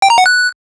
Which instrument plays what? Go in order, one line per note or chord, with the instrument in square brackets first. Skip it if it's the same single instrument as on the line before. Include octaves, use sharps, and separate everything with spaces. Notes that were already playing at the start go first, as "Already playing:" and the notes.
[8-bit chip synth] G5
A#5
F#5
F#6